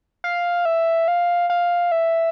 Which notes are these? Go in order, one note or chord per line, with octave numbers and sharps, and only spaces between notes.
F5
E5
F5
F5
E5